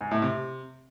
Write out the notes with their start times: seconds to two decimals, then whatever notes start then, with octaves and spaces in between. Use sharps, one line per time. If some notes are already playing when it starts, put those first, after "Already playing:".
0.01 G#2
0.11 A2
0.22 C3